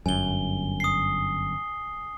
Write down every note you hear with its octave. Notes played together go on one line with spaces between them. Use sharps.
G1 F#2 G#5 G7
D#6 C7